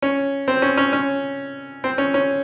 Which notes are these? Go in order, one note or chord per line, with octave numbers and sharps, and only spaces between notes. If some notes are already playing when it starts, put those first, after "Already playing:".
C#4
C4
C#4
C#4
C#4
C4
C#4
C#4